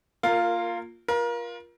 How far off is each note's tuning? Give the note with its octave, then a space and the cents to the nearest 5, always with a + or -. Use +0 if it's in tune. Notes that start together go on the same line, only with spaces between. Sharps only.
A#3 +0 F4 +0 A#4 -25
F4 +0 A#4 +30